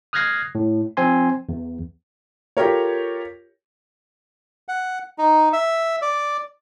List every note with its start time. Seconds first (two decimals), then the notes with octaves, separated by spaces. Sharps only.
0.13 D#6 F6 F#6 G#6 A#6 C7
0.55 A2
0.97 F3 C4 G#5 C6
1.49 E2
2.57 F4 G4 A4 A#4 C#5
4.68 F#5
5.18 D#4
5.53 E5
6.02 D5